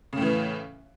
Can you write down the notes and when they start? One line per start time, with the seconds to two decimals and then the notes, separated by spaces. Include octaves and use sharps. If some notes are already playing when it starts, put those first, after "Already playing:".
0.13 C#3
0.17 A2
0.22 E3